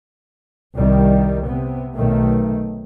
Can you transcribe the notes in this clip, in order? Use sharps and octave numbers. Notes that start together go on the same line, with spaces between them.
C2 D#3 G3
C3 B3
B1 D#3 A3